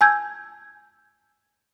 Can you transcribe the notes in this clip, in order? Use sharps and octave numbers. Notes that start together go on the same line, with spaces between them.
G#5 A5 E6 G6 G#6